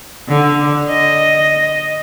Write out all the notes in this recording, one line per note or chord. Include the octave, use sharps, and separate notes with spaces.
D3
D#5